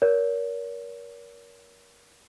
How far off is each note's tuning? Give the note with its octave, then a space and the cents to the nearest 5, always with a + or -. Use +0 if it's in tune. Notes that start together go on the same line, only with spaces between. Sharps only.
A#4 +25 C#5 +40